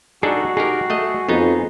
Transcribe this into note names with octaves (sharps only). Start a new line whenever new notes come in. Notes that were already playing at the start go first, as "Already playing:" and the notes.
D4 D#4 F#4 G#4 A4
D#4 G4 G#4 A#4
A3 D#5
F2 B3 D#4